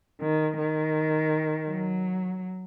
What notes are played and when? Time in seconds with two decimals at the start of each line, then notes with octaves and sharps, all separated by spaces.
0.21 D#3
0.58 D#3
1.68 F#3